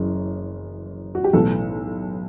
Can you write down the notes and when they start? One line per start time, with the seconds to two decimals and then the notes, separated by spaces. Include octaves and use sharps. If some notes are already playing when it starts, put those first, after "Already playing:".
Already playing: F#1 F#2 E3
1.15 F#4
1.24 G4
1.33 B1 A2 E3 A4